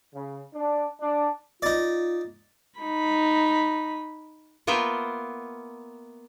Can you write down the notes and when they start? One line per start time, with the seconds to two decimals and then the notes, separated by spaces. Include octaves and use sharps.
0.13 C#3
0.54 D4
1.00 D4
1.62 D#4 F4 D5
2.80 D#4 B5
4.67 A#3 B3 F4 E5 G5